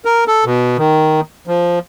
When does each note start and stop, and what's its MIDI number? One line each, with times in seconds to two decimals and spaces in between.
0.05 0.24 70
0.28 0.44 69
0.45 0.77 47
0.78 1.21 51
1.47 1.79 53